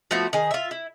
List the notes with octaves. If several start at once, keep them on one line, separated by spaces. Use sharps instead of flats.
F3 A3 B3 F#4
D#3 G#4
F4 E5
E4